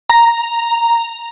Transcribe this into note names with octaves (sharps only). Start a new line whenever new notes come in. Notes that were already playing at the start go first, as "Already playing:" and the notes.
A#5